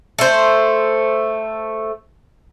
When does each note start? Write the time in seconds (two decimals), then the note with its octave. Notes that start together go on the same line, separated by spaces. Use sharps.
0.18 A3 C5